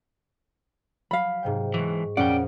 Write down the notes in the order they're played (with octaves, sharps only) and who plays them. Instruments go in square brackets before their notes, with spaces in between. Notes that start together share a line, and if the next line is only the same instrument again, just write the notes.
[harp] F#3 B6 [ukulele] F5 B5
[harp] G#2 C3 G5
[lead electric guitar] G#2 E3 [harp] C#6
[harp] F2 A#2 [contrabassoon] C#3 [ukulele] C#4 F#5 [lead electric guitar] D5 G5